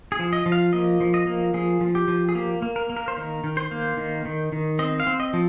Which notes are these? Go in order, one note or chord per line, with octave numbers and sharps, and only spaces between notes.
G#4
F3
D#5
F3
F5
A#3 D#5
F3
D#5
A#3
F3 G#4
F3
G4
F3
G#4
A#3 G4
A#3
A#4
A#3
A#4
C5
D#3 A#4
D#3
C5
A#3
D#3
D#3
D#3
C4 D#5
F5
C4
D#5
F3